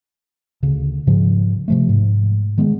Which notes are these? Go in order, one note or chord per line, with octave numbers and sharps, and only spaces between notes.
D2 C#3
G#2 C#3 F3 G3
C3 F3 A3
G#2
D#3 G#3 B3